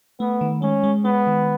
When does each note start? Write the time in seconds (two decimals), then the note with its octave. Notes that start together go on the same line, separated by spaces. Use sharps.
0.20 A3 B3
0.41 D#3
0.62 G#3 C#4
0.84 G#3
1.05 G#3 B3
1.27 D#3